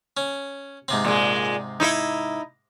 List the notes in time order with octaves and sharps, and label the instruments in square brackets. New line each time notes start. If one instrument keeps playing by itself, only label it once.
[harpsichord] C#4
G#2 C3 C4
[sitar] A#2 G#3
D#4 E4 E5